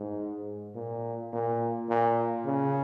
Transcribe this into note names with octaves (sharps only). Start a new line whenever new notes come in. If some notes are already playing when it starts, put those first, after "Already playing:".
Already playing: G#2
A#2
A#2
A#2
C#3